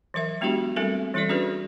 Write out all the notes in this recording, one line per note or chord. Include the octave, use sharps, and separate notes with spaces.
E3 F#3 A#4 E5
G#3 B3 D4 E4 F#4 G4
G3 A3 C4 E4 A4 A#4
E3 G3 E4 A4 D5
C#4 D4 F#4 G#4 B4